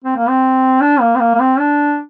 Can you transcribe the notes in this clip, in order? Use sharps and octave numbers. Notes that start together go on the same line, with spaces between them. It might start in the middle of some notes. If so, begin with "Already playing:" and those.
C4
A#3
C4
D4
A#3
C4
A#3
A#3
C4
D4